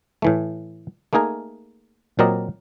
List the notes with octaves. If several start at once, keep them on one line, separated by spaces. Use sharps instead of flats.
A2 E3 A3
A3 A#3 D#4 G#4 A#4 G#5
A#2 F#3 C4 A#4 D5 D#5